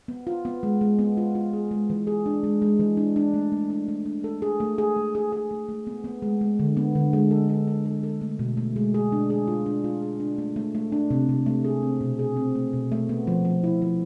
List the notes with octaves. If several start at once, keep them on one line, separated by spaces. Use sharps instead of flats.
B3
F4
B3
G#3
G#3
B3
F4
F4
G#4
G#3
E3
G#4
D4
G#3
G#3
E3
D4
D4
A3
A3
D4
A3
D4
A4
G#4
A3
G#4
A3
G#4
G#4
A3
A3
B3
B3
G#3
G#3
D3
B3
D3
G#3
A4
A4
A4
A4
A4
A3
B2
A3
G#3
G#4
D4
G#4
F4
D4
F4
G#4
D4
A3
A3
A3
D4
C3
C3
A3
G#4
C4
B2
G#4
C4
A3
B2
A3
B3
F3
F3
E4
F3